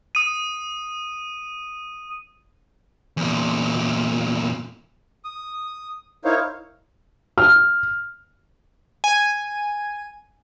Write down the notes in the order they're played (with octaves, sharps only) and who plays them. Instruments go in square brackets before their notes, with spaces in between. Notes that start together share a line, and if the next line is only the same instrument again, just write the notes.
[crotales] D#6 D#7
[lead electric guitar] E2 A#2
[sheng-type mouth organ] D#6
D#4 E4 A#4 C5 C#5 F5
[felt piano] F6
[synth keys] G#5 D#7